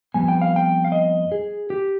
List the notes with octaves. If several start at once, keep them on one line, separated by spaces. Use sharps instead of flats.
F2 C3 G3 B3 G#5
G5
F5
G5
F5
D#5
G#4
G4